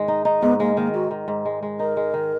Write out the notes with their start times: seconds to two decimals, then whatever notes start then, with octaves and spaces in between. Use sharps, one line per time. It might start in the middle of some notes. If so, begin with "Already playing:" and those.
Already playing: G#2 D#3 G#3
0.08 D#4
0.25 D#4
0.42 G#2 B3
0.60 G#3 A#3
0.76 D#3 A#3
0.94 G#2 F#4
1.11 D#3
1.28 G#2
1.45 G#3
1.63 G#3
1.79 D#4 A#4
1.97 G#3
2.14 D#3